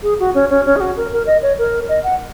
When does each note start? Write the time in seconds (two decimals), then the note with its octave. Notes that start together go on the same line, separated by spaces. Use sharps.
0.03 G#4
0.20 F#4
0.34 C#4
0.50 C#4
0.66 C#4
0.76 G#4
0.81 F#4
0.97 A#4
1.12 A#4
1.26 D#5
1.42 C#5
1.58 A#4
1.89 D#5
2.03 F#5